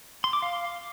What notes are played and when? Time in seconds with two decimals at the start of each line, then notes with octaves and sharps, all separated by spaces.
0.24 C6
0.33 D6
0.42 F5